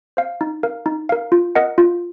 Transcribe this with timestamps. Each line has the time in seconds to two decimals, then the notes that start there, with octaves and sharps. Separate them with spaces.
0.17 C5 F5
0.41 D#4
0.63 A#4 F5
0.86 D#4
1.09 A#4 F5
1.32 F4
1.55 A#4 D#5 F#5
1.78 F4